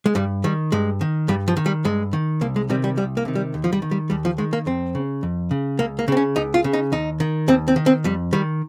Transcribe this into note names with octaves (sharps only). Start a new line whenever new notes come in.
G#3
G2 G3
D#3 G3
G2 G#3
D#3
G2 G3
F3
D#3
G3
G2 G#3
D#3
C2 A#3
G#3
C3 D#3 G3
G3
C2 G3
A#3
C3 D#3
G3
D#2
F3
G3
D#3
G3
D#2 G3
F3
D#3 G#3
A#3
F2 C4
C#3
F2
C#3
C#2 A#3
A#3
C#3 C4
C#4
C#2 D#4
F4
C#3
D#4
D#2 D#4
D#3
D#2 C4
C4
D#3
C4
F2 G3
D#3 G3